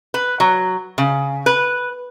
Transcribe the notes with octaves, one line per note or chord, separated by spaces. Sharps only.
B4
F#3
C#3
B4